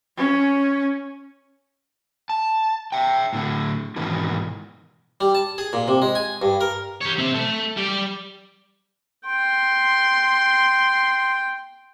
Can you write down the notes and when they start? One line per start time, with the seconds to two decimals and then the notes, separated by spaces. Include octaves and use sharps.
0.17 C#4
2.29 A5
2.92 E5 G5
3.33 A2 D3
3.96 G#2 B2 D#3 E3
5.21 G3
5.35 A5
5.58 G#4
5.73 A#2
5.88 C3
6.02 G#3
6.15 G#5
6.42 G2
6.61 A#4
7.01 G4 C#5
7.18 C4 E5
7.34 A3
7.77 G3 D5
9.26 G5 C6